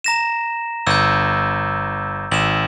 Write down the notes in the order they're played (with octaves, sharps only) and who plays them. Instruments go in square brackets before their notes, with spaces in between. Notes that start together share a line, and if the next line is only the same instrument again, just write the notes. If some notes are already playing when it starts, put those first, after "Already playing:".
[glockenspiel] A#5 A#6 E7
[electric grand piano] G1 [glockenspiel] E6 G6
[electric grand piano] G#1 [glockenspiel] E7 F#7